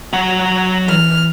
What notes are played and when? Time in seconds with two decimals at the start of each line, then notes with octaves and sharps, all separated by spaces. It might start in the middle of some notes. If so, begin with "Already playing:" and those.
0.13 F#3 F#5
0.87 E3 F6